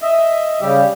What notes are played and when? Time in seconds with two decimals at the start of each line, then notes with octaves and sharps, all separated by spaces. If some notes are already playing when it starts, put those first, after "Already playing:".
0.02 D#5 E5
0.61 C#3 G3 G4